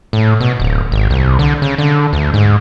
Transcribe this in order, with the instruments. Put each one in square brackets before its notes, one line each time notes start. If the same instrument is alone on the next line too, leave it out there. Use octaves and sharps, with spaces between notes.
[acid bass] A2
B2
D1
G#1
C2
D3
C#3
D3
D2
G#2